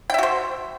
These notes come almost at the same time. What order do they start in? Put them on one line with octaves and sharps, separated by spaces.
G5 E5 F#4 C5